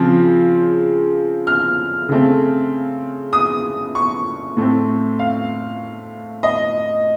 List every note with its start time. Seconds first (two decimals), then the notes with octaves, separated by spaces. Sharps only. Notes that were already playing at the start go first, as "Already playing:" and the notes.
Already playing: C#3 F3 C4
1.47 F6
2.09 C#3 A3 C4
3.33 D#6
3.95 C#6
4.57 A2 A3 C4
5.19 F5
6.43 D#5